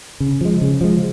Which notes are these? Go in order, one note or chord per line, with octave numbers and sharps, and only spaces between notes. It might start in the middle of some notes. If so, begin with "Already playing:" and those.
C#3
F3 G#3
C#3
F3 G#3